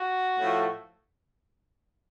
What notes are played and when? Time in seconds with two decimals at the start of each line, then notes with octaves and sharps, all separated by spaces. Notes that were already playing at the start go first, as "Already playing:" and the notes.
Already playing: F#4
0.39 A2 F3 A3